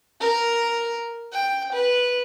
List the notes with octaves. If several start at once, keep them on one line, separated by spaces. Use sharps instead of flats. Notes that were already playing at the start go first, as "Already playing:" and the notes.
A#4
G5
B4